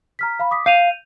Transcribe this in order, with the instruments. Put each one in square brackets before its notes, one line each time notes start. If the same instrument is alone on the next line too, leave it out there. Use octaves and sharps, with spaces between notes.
[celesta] A#5 F6 B6
F5 B5
D6 D#6 B6
[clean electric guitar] F5 [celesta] G6 D#7 F7